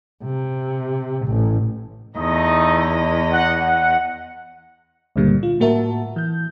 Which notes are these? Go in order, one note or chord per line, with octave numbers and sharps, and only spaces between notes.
C3
A1
E2 A3 D#4 D#5 D#6
F#5
F#5
C#2 G2 A#2 D3 G3 A#3
F4
A2 A#3 F#4 A#4 E5 A5
E3 G6